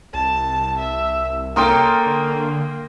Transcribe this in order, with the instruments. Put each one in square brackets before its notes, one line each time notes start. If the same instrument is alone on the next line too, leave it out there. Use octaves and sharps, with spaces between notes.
[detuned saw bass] C2 [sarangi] A5
[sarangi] E5
[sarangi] A#3 [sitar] C#4 A4 A#4 [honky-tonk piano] G5 C6 D#6
[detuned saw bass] D3